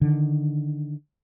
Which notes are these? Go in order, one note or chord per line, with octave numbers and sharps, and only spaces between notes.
D3 D#3